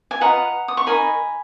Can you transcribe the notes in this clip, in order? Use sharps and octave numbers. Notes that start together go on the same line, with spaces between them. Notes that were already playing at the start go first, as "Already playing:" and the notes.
G#5
F4 B4 D#5 F#5 A#5
D#6
C#6
D#4 A#4 D#5 G#5 B5